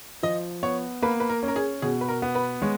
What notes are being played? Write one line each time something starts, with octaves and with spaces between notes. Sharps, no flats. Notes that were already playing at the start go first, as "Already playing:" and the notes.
F3 D#5
B3 C#5
A#3 B4
B4
A#4
C#4
A#4
G#4
B2 G#4
B4
A#4
B3
B4
G#3 C#5